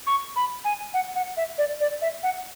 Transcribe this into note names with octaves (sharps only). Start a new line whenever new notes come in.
C#6
B5
G#5
F#5
F#5
E5
D5
D5
E5
F#5